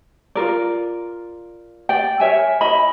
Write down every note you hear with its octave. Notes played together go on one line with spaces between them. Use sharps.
F4 A#4 D5
D5 G5
A#4 C#5 E5 G#5
E4 D#5 B5